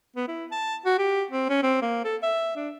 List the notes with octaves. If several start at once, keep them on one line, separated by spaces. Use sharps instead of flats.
B3
E4
A5
F#4
G4
C4
C#4
C4
A#3
A4
E5
D4